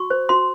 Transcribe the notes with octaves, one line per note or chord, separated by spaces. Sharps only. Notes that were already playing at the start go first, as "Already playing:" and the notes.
Already playing: F#4 C#6
C5
F#4 C6